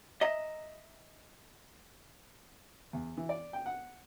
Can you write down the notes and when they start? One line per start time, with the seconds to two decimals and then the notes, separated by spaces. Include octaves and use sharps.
0.21 D#5 E5 A#5
2.93 E2
3.17 E3
3.29 D5
3.53 G5
3.66 F#5